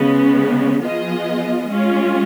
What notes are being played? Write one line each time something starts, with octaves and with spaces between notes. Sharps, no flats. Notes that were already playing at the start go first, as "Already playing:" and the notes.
Already playing: C#3 G#3 B3
F3 B3 F4 G#4 D#5
G#3 C#4 F4